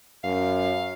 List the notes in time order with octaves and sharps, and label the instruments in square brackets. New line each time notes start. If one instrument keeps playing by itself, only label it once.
[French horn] F#2 [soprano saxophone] F5